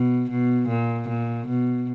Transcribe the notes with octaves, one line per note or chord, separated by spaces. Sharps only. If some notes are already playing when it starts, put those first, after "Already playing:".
Already playing: B2
B2
A#2
A#2
B2